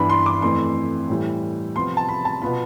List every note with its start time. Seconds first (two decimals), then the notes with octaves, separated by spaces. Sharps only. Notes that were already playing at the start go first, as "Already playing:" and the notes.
Already playing: G2 E3 B3 D4 B5
0.10 C6
0.26 D6
0.42 F2 E3 A3 C6
1.09 A2 E3 G3
1.75 C3 F3 B3 F4 C6
1.97 A5
2.09 B5
2.25 A5
2.42 B2 B3 F4 B5